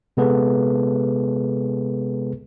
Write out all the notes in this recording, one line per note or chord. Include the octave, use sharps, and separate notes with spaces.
C3 G#3 B3 G#4 A4 B4